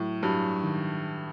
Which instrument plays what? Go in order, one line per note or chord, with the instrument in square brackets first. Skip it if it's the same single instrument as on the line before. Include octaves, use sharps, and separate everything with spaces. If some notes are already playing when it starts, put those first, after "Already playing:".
Already playing: [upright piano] A2 [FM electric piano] F#3
[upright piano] G2 [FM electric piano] F#3
[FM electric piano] D#3